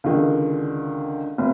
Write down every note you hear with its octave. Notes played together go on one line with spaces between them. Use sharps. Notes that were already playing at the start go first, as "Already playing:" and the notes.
C#2 D3 D#3
F1